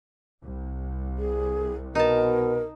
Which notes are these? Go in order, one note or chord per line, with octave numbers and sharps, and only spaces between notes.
C2
G#4
B2 D#4 A#4 A5